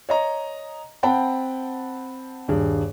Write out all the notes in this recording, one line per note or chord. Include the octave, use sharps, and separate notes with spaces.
C#5 D#5 A#5
C4 F#5 G5 A5 B5
D#1 G2 G#4